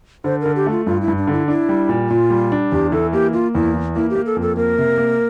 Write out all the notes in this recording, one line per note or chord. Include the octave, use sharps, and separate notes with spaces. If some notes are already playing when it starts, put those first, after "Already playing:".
D3 C5
D3 A#4
G4
A3 F4
G2 F4
E4
G2
D4
D3 E4
D4 E4
G3
A#2
A#2 F4
G3
D4
E2 G4
E3 A4
A#3 G4
A#3 F4
E2 E4
E3
A#3 E4
G4
A#3
A4
F2
A4
A#3 A#4
C3
A#3